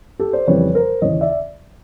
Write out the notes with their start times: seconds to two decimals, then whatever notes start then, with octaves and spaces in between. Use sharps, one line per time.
0.19 G4 A4
0.33 C5 D5
0.47 F2 C#3 E3 G3 B4 C#5
0.75 A#4 C5
1.02 D#2 C#3 E3 C#5 D#5
1.21 D5 E5